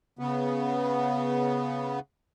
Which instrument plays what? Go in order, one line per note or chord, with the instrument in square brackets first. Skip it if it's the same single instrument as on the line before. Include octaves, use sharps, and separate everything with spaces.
[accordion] C#3 B3